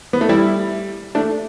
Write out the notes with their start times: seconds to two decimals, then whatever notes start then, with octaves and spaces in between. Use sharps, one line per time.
0.13 B3
0.21 A3
0.29 G3 E4
1.15 A3 D4